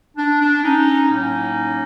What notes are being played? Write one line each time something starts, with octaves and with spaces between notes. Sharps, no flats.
D4
D4
C#4 D#4
A2 F#3 A#3 C#4 D#4